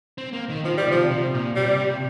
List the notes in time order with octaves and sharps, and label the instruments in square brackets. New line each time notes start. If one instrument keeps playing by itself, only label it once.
[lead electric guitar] C4
A#3
D#3
[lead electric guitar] D#3 [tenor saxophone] F3
[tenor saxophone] G3
[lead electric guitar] C3 [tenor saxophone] F3
[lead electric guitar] C3
A#2
[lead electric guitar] C3 [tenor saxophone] G3
[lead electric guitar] C3